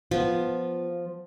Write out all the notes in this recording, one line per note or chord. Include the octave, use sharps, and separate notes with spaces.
F3 B3 F4